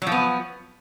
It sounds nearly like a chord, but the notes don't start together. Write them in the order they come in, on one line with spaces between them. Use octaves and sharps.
F#3 F3 B3